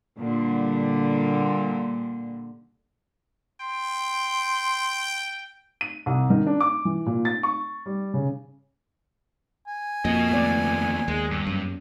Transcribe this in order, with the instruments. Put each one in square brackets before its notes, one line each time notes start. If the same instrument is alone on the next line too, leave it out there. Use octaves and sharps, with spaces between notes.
[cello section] A#2 D3 G3
[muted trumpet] G5 [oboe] C6
[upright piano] D#7
C2
D#3
D4
D6
E3
A#2
A6
C#6
G3
C#3
[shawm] G#5
[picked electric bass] F2 [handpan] A#3 [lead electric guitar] F#4 D#5
[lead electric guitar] D#2 A3 [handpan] B3 D5
[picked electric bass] D#2 [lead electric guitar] G#3
[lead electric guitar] G2
[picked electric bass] F#2